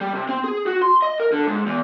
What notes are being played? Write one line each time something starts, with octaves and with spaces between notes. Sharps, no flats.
G3
C3
C4
G#4
F#4
C6
D#5
A#4
D3
G#2
E2